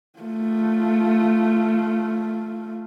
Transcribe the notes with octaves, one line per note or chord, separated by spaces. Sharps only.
A3 F4